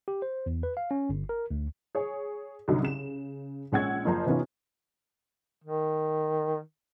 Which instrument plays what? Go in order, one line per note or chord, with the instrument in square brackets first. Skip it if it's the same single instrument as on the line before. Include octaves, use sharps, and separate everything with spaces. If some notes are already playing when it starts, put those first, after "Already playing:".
[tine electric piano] G4
C5
E2
B4
F5
C#4
G1
A#4
D2
[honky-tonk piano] G#4 C#5
C2 D3 F#3 D#4
C#3 E7
A#1 G#3 C#4 F#5 E6 G#6
F#1 F3 C5 A#5
C3 E3 B3 C#4 D#4 F4
[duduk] D#3